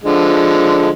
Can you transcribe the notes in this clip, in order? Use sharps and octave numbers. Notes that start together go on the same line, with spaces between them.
D3 F3 G#3